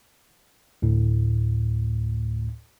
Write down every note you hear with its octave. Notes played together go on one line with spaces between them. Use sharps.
D2 A2